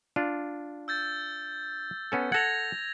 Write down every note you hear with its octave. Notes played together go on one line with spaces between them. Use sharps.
D4 F4
E6 G6 A6
B3 C#4 A4
A4 F#5 G#6 A#6 F7